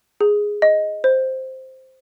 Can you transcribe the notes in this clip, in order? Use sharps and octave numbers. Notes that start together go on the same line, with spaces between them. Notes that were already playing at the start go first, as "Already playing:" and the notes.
G#4
D#5
C5